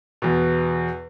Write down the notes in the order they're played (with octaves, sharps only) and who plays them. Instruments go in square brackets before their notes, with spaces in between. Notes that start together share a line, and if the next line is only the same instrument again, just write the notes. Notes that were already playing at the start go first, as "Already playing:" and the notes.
[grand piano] E2 B2